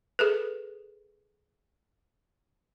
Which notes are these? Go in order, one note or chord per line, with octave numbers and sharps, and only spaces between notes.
G#4 A4 B4